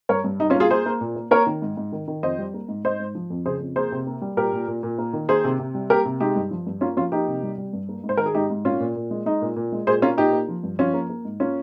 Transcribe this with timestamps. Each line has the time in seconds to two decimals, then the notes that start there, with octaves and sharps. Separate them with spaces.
0.09 G2 A#4 C#5
0.24 G2
0.40 G3 D#4
0.50 C#4 F4
0.55 A#3
0.60 F4 G#4
0.70 A#3 G#4 C5
0.86 A#3
1.01 A#2
1.16 A#3
1.31 A#3 A#4 C#5
1.47 D#3
1.62 G#2
1.77 G#2
1.92 D#3
2.08 D#3
2.23 F2 C5 D#5
2.39 G3
2.54 A#3
2.69 G#2
2.84 G#2 C5 D#5
3.00 G#2
3.15 F3
3.30 F2
3.46 C#3 G#4 C5
3.60 F2
3.76 A#3 G#4 C5
3.92 C3
4.07 A#3
4.22 G3
4.37 A#2 G4 A#4
4.53 A#2
4.68 A#2
4.83 A#2
4.98 A#3
5.13 D#3
5.29 A#3 G#4 C5
5.44 C3
5.59 C3
5.75 G3
5.90 A#3 G4 A#4
6.05 C3
6.20 G#3 D#4 G4
6.36 G2
6.51 F3
6.67 G2
6.81 A#3 C#4 F4
6.97 F3 C#4 F4
7.12 A#3 D#4 G4
7.27 C3
7.43 G3
7.58 G3
7.73 G2
7.89 A#3
8.04 G#2
8.09 C5
8.17 D#3 A#4
8.26 G#4
8.34 G#2 D#4 G4
8.50 G#2
8.65 A#2 C#4 F4
8.80 A#2
8.96 A#2
9.11 G#3
9.26 G#3 D#4
9.42 A#2
9.56 A#2
9.72 G#3
9.87 A#2 G#4 C5
10.02 A#3 C#4 F4
10.17 A#2 D#4 G4
10.33 A#3
10.48 F3
10.63 G2
10.79 F3 C#4 F4
10.94 A#3
11.10 A#3
11.25 G#2
11.40 A#3 C#4 F4